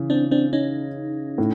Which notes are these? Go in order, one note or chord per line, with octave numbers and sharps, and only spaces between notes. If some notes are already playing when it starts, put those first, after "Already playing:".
Already playing: C#3 E3
C4 D4
C4 D4
C#4 D#4
A2